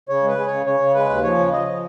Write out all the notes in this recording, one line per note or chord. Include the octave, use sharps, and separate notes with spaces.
C#3 C#5
G#3
B4
G#3
C#3 C#5
C#3 C#5
C#3
G#3 B4
D#2
F3 C#5
C#3
F3 D#5
F3